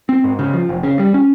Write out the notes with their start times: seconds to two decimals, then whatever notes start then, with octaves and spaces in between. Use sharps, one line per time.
0.09 C4
0.24 G#2
0.39 C#3
0.53 F3
0.69 F1
0.83 C#3
0.99 G3
1.14 C#4